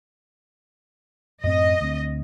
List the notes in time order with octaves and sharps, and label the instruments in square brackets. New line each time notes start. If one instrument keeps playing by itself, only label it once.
[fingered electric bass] F#2 A2 C4 [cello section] D#5
[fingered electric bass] D2 C4